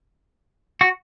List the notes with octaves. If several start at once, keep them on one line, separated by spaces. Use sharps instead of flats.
F#4